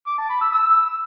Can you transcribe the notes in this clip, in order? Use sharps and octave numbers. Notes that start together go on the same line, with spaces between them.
D6
A5
B5
E6
E6